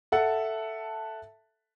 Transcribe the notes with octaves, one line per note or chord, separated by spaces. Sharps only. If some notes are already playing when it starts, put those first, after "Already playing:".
A4 E5 F#5 A5